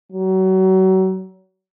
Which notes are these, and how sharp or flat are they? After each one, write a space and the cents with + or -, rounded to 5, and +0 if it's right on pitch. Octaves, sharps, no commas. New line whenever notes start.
F#3 +30